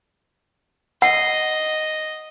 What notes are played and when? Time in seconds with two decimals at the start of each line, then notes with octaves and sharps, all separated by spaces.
1.02 D#5 F#5